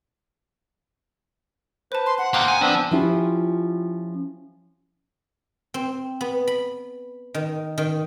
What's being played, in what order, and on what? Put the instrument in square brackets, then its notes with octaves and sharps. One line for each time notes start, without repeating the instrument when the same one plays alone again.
[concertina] B4 [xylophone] C5 A5
[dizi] C6
F#5
[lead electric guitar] D3 A#3 [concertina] F5 G5 C6 [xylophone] A#5 D#6 F#6
[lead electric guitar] G#5
[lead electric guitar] F3 [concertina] B3 C4 D4
[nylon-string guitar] F3 C#4 E4 F4 G4
[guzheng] C4
B3
B5
D#3
D#3